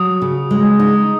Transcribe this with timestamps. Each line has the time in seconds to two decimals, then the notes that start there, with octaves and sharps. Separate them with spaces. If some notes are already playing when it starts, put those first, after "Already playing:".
Already playing: F#3 F#4 D#6
0.22 C#3
0.51 G#3
0.79 D#4